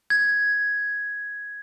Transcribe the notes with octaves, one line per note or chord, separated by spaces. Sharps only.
G#6